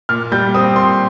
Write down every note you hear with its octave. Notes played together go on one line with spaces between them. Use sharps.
A#2 F6
G3 G6
C4 D#6
A#2 C6